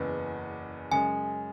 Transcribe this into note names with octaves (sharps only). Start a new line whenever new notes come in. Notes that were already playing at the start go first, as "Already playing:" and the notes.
Already playing: F#1 E2 C#3 B4
F#2 C#3 G#3 G#5